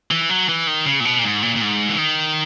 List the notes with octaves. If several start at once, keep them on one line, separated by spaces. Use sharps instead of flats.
E3
F#3
E3
D#3
C#3
A#2
B2
A#2
G#2
A#2
A#2
G#2
E3
D#3